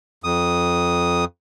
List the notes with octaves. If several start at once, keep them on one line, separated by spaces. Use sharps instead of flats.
F2 D#6